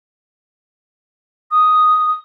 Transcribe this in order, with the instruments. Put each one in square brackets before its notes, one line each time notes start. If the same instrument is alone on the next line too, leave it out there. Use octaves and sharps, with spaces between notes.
[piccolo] D#6